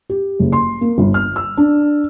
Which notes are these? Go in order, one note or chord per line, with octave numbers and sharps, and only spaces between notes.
G4
F#1
C6
A#3
G1
F6
E6
D4